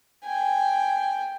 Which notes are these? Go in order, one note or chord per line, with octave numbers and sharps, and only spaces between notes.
G5 G#5